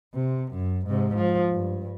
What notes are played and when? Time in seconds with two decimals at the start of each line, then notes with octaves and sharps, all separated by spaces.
0.14 C3
0.52 F#2
0.87 G#2 C3
1.15 F3
1.52 G2